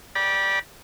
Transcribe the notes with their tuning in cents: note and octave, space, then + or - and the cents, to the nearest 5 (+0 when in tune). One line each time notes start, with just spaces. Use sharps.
D5 +0 G5 +0 B5 -30